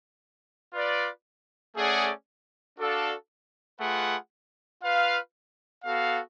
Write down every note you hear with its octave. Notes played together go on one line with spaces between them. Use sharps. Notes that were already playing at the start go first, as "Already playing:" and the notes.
F4 B4 D5
A3 C#4 G#4 D5 F#5
D4 F#4 A4 D5 F5
A3 F4 G#4 B4 F#5
F4 B4 F5
B3 F#4 A4 F5